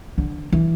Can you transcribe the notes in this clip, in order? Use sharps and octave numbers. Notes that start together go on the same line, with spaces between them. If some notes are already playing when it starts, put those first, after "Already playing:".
D3
E3